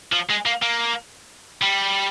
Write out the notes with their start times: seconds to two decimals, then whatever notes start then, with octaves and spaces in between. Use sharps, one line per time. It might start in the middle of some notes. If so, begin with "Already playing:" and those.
0.12 F3
0.29 G#3
0.46 A#3
0.62 A#3
1.62 G3